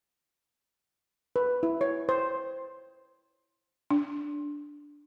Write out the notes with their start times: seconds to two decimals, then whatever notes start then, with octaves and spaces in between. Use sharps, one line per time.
1.36 B4
1.63 E4
1.81 C#5
2.09 C5
3.90 D4